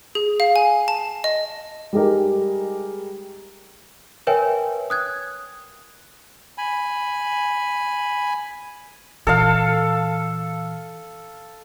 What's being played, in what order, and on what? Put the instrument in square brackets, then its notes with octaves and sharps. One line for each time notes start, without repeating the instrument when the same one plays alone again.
[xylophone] G#4
F5
G#5
A5
D#5
[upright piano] G3 G#3 D#4 G4 A#4
[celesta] A#4 B4 C#5 E5 G5 G#5
D#6 F#6 G#6
[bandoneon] G#5 B5
[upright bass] A#2 E3 [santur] A4 F5